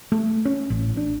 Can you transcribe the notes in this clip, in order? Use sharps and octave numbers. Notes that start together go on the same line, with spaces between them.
A3
C#4
A1
D4